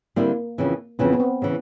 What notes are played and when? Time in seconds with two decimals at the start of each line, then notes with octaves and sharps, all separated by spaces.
0.16 D3 G3 A#3 C4 E4
0.58 F2 C#3 E3
0.99 F2 C#3 E3 B3
1.13 B3
1.20 C4
1.42 C#3 E3